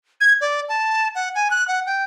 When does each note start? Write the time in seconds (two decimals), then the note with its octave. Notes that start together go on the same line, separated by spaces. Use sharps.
0.21 G#6
0.41 D5
0.69 A5
1.15 F#5
1.35 G#5
1.50 F#6
1.68 F#5
1.86 G5